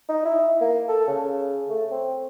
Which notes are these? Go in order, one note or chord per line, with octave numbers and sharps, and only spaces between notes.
D#4
E4
A#3
A4
C#3
A3
C4